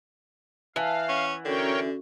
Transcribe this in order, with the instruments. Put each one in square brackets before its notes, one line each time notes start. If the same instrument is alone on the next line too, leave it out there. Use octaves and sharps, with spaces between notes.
[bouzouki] E3 [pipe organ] F5 [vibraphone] A5
[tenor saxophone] C#4 [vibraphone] F#5
[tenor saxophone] D3 [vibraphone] C#4 F#4 A4 [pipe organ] A#4 C#5 G5